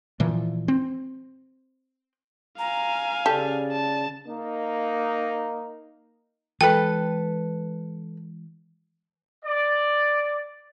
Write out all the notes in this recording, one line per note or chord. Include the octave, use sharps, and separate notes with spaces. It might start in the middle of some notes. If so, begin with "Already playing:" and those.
A#2 E3 F3
C4
F5 G#5 A#5
C#3 G4 A4 D5
A5
A#3 D#4
E3 G#3 A4 B4 G5
D5